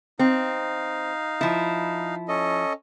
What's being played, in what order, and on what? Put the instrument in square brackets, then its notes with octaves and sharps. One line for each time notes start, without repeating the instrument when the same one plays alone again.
[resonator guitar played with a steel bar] C4 [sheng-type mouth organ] D#4 F5
[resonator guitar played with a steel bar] F3 E4
[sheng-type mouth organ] C#4 A4 D#5